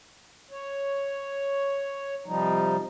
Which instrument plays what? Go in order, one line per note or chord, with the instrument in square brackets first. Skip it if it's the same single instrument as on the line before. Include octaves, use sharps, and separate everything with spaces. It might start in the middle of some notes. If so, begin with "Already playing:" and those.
[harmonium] C#5
C3 F3 G3 D#4